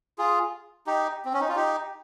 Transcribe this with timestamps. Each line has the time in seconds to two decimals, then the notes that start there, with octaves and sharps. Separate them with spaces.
0.18 F4 G#4
0.87 D#4 G4
1.25 C4
1.33 C#4
1.41 D#4
1.48 F4
1.56 D#4 G4